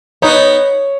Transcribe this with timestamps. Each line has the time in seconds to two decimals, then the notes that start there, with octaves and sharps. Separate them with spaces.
0.22 B3 D#4 C#5